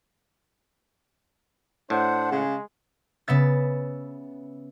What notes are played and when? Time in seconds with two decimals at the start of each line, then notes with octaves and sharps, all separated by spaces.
1.90 A2 D4 C5 F#5
2.31 C#3 G#3
3.28 C#3 B3 E5 A6